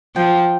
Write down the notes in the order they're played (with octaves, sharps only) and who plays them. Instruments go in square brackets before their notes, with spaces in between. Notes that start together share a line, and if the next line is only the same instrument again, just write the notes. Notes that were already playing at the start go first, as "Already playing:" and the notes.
[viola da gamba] F3 [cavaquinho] G5